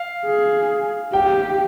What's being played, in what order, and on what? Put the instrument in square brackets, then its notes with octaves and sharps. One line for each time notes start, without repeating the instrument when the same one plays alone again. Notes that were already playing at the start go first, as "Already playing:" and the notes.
Already playing: [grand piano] F5
[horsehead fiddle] G#4
[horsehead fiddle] G4 [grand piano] G5